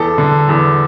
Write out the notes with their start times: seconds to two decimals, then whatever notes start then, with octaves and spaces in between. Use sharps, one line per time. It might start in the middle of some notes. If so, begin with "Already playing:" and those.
Already playing: E2 A4
0.18 D3
0.49 E2